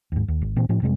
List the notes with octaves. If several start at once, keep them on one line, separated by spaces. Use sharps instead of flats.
D#2 G#2
D#2
G#1
A#2 E3 C4
A2 F3 C#4
F2 C3 G3 G#3